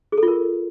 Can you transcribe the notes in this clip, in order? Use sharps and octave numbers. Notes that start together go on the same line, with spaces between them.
G#4
A4
F4
A#4